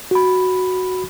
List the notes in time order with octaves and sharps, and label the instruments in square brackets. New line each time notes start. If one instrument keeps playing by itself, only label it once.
[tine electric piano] F#4 B5